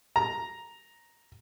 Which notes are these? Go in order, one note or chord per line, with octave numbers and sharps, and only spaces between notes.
A#5